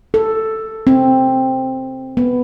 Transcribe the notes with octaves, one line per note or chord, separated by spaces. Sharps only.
A4
C4
B3